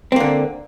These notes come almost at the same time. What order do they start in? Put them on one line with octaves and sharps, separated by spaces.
C4 A#3 D3